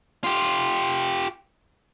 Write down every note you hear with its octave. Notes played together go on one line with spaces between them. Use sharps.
F4 G4